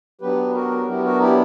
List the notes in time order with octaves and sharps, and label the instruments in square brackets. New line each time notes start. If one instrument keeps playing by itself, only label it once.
[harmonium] F#3 B3 D4 G4 B4
F#4 A#4
F#3 B3 D4 E4 G4
F#4 A#4
E4 G4